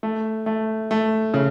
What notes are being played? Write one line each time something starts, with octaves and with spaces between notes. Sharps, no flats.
A3
A3
A3
C#3